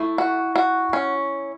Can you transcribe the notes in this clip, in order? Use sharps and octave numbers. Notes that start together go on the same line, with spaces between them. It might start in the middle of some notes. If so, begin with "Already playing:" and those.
Already playing: A3 E4
F#4
F#4
C#4